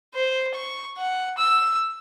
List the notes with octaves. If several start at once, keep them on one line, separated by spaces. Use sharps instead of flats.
C5
C#6
F#5
E6